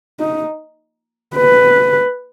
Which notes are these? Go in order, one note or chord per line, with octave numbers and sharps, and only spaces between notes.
D#4
B4